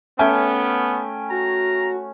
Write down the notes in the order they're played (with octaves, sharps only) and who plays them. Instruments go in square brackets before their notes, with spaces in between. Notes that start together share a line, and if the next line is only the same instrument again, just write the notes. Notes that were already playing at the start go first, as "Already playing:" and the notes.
[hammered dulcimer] A3 C#4 [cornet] B3 [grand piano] E5 G5 G#5
[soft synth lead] F#4 [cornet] A#5